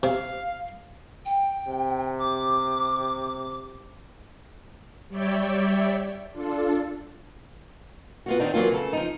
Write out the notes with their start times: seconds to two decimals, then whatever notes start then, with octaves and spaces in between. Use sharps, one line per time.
0.03 C3 F5
1.25 G5
1.67 C3
2.19 D6
5.09 G3 C#5 D5 E5 G5
6.31 D4 F4 A4
8.26 B3 F4 F#4
8.39 D#3 C4 D4 D#4
8.54 E3 F#3 A#3 F4
8.71 C#3 A4
8.93 F3 D#4